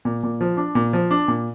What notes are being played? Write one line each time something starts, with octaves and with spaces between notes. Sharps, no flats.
A#2
A#2
F3
D4
A#2
F3
D4
A#2